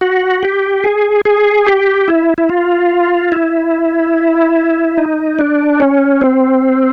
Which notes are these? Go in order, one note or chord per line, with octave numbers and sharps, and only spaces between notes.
F#4
G4
G#4
G#4
G4
E4
E4
F4
E4
D#4
D4
C#4
C4